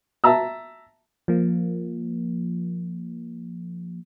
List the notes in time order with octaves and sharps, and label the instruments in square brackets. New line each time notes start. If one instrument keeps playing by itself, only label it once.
[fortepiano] E5 A5 A#5 E6
[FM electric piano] F3 A#3